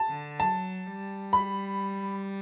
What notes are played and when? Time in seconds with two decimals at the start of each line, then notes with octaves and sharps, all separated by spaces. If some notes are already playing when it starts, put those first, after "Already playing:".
Already playing: A5
0.09 D3
0.40 F#3 A5
0.86 G3
1.33 B5